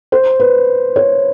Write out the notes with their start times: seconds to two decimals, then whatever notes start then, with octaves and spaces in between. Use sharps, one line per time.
0.12 C5
0.40 B4
0.96 C#5